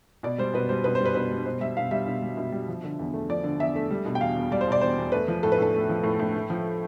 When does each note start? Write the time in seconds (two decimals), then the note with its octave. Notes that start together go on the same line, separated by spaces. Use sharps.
0.23 B2 D5
0.38 G3 C5
0.54 B2 B4
0.69 G3 C5
0.84 B2 B4
0.95 C5
1.01 G3 B4
1.15 B2 B4
1.31 G3
1.46 B2 C5
1.61 G3 E5
1.77 B2 F5
1.91 G3 E5
2.07 B2
2.22 G3
2.37 B2
2.52 G3
2.68 F3
2.83 D3
2.99 E2
3.14 A3
3.29 F3 D5
3.44 D3
3.59 E2 E5
3.76 A3
3.91 G3
4.06 B2
4.15 G5
4.21 E2 F5
4.36 E2
4.51 G3 D5
4.61 C5
4.67 B2 D5
4.81 E2 C5
4.98 E2
5.12 A3 B4
5.28 F3
5.43 A2 A4
5.52 B4
5.58 A2 A4
5.74 A3
5.89 F3
6.04 A2
6.19 A2
6.35 A3
6.50 F3